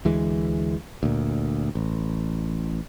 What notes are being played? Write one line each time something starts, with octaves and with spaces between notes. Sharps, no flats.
D2 E3 G#3
D2 A#2
A1